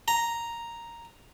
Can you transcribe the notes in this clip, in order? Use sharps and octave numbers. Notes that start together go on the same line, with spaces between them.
A#5